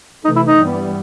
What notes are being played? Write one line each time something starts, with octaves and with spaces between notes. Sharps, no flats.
C3 E3 A3 D#4
E4
D#4
G2 E3 G3 B3